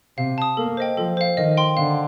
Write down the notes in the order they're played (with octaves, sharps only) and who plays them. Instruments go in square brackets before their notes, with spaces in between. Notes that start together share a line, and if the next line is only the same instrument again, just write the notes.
[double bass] C3 [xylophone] F5
[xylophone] A5 D#6
[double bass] A#3 [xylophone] A4
[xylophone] C5 D#5 G5
[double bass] F3 [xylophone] A4
[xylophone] C5 F5
[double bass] D#3 [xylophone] D#5
[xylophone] G5 C6
[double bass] D3 [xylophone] F5